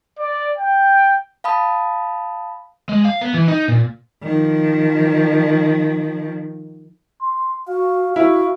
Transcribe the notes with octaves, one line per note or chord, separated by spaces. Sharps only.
D5
G5
F5 A5 B5 D#6
G#3
F5
B3
E3
D#4
A#2
D#3 F3
C6
F#4 F5
E4 F#4